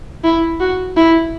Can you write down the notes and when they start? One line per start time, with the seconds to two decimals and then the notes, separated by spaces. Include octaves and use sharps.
0.24 E4
0.60 F#4
0.97 E4